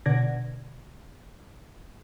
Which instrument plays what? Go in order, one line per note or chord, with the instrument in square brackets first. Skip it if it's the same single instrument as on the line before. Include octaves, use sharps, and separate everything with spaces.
[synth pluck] B2 D3 D5 F#5 G#6 A#6